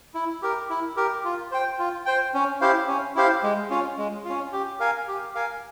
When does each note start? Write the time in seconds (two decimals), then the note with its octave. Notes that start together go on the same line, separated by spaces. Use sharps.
0.14 E4
0.42 G4 A#4
0.70 E4
0.97 G4 A#4
1.25 F4
1.52 C5 G5
1.79 F4
2.06 C5 G5
2.34 C#4
2.61 E4 G4 C5 F5
2.88 C#4
3.15 E4 G4 C5 F5
3.43 G#3
3.70 C#4 F4
3.98 G#3
4.25 F4
4.30 C#4
4.53 G4
4.80 A#4 F5 G#5
5.08 G4
5.35 A#4 F5 G#5